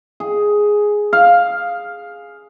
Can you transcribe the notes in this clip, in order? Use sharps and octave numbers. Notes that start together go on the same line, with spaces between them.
G#4
F5